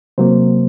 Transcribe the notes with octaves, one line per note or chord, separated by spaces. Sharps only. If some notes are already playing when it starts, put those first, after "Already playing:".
C3 F#3 A#3 C5